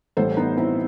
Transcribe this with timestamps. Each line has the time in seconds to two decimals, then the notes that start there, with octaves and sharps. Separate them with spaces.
0.17 A1 A2 G3 A4 C5
0.37 B3 D#4
0.57 C4 E4